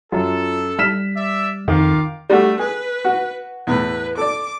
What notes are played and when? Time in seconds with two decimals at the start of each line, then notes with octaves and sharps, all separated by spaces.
0.12 F#2 F4 A4
0.79 G3 F6 B6 E7
1.16 D5 E5
1.68 F2 D#3 F4 F5 D6
2.30 G3 A3 D4 F#4
2.59 G#4 B4
3.05 F#4
3.67 E2 A2 B4
4.18 A4 D5 D6